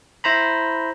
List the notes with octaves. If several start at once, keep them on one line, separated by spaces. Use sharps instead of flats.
E4 C5 A#5 B5